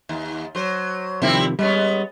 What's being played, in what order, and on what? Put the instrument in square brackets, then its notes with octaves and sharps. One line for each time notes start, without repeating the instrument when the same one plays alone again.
[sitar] D#2
F#3 C5
[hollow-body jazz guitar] C3 D#3 F3 [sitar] G3 C4 E4
[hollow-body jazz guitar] G3 [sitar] G#3 B3 C#4